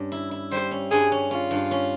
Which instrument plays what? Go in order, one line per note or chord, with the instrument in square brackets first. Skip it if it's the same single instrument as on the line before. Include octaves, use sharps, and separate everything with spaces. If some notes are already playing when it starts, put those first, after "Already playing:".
Already playing: [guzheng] G2 C#4
E4
E4
[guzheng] G3 [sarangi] C5
[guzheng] C#4
[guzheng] G2 [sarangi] G#4
[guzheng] C#4
[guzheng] C#4 [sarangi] F4
[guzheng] G2
C#4